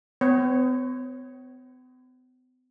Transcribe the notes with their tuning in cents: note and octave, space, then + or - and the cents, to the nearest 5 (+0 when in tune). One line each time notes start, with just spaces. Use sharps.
B3 +45 C#5 -15